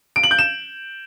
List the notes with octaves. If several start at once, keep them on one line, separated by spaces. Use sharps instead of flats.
D7
F#7
G6
E7